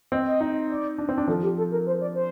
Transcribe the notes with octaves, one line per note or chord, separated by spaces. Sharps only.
C4 D#5
D#5
D#4
D5
D4
C4
D4
F3 A4
G4
A4
A#4
C5
D5
C5